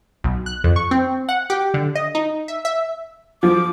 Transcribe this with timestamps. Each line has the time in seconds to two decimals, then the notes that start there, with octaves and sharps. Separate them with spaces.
0.24 B1
0.46 F#6
0.64 F2
0.76 C#6
0.91 C4
1.29 F#5
1.50 G4
1.74 D3
1.95 D#5
2.15 D#4
2.48 E5
2.65 E5
3.43 F3 D6